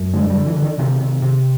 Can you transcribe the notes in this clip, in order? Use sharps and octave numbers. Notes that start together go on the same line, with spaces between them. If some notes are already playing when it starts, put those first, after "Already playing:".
Already playing: F#2
D3 G#3
G3
D3
E3
D3
D#3
C3 D#3
C3
C3